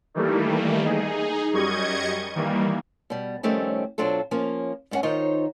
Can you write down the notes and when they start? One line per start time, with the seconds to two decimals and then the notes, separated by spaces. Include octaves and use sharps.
0.14 D#3 E3 G3 A3 A#3
0.84 D#4 G#4
1.53 F#2 G3 D#5 C#6 G#6
2.35 D#3 E3 G3 A#3
3.10 B2 G3
3.43 F2 D#3 G3 A3 C4 C#4
3.98 B2 F#3 C4 D4 F4 A4
4.31 F3 A#3 C#4
4.91 G#2 B3 C#4 F#5 G#5
5.03 D#3 D#4 F4 C5 C#5